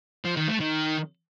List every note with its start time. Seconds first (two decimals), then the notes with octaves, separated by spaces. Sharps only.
0.25 F3
0.37 D#3
0.49 A3
0.61 D#3